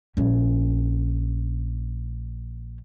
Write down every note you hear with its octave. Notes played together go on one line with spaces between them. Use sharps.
A#1 C#4